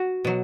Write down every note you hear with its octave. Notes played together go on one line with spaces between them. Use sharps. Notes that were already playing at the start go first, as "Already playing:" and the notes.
Already playing: F#4
B2 F#3